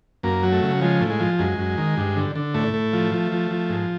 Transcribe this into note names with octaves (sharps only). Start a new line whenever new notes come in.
F#2 A#3
F#3
A3
C#3
F3 G#3
A2
G#3
F3
F#2 G#3
F#2
D#3
G2
D3
D3
A2 A3
A2
F3
F3
F3
F3
G#2